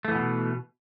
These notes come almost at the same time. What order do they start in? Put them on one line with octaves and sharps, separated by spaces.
A3 E3 B3 B2